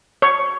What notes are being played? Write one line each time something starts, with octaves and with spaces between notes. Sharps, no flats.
C#5